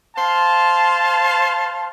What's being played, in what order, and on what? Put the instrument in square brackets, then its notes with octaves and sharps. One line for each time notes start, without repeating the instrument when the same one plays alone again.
[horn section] C5 F5 A5